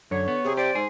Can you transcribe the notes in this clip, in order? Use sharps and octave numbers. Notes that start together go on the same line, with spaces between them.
F#2 D3 C#5
B3
C3 G#4
G4 C5 D5
G#2 G#4